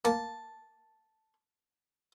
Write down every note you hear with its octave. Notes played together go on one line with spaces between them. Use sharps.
A#3 A5